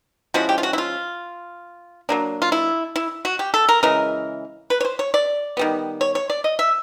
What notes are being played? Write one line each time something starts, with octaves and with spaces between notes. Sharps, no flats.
F3 G#3 C#4 E4 F#4
G4
F4
F#4
E4
F4
F#3 A#3 D4
F4
E4
E4
F#4
G4
A4
A#4
C#3 E3 G#3 A#4
B4
C#5
C5
C#5
D5
D#3 G3 B3
C#5
C#5
D5
D#5
E5